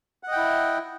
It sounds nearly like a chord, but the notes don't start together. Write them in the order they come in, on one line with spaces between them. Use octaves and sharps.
F#5 D#5 G5 E4